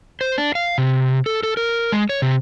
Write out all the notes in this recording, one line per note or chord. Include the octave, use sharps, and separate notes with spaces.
C5
D4
F5
C3
A4
A4
A#4
G#3
C#5
C3